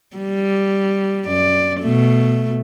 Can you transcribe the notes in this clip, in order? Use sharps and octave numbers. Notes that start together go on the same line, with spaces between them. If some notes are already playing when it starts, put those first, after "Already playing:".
G3
F#2 D5
B2 A3